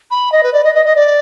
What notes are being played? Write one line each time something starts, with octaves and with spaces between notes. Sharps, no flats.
B5
D#5
B4
D5
D#5
D#5
D#5
D5